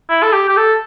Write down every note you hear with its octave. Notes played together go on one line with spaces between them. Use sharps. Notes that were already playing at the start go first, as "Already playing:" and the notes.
E4
A4
G4
G4
A4